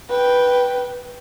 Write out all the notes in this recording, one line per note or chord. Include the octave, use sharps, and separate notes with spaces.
B4 G5